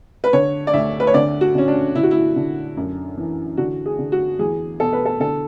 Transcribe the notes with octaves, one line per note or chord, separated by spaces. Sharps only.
B4
D3 C#5
D5
D2 E5
B4
C#5
D3 D5
F#4
D3 C#4
D4
D3 E4
F#4
E4
D3
F#2
E3
D3 F#4
G#4
D3
F#4
E2 G#4
B2 A4
B4
A4
D3 A4